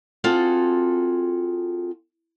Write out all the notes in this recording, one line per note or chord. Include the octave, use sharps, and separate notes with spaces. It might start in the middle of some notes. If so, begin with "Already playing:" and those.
C4 F4 F#4 G#4 A4